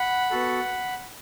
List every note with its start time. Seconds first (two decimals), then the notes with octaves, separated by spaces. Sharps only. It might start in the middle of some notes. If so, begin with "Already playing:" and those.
Already playing: F#5 B5
0.31 B3 F#4 A4